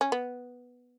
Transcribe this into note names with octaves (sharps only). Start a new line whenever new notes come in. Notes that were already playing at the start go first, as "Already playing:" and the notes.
C#4
B3